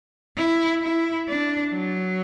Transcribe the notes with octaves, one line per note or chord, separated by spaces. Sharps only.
E4
E4
D4
F#3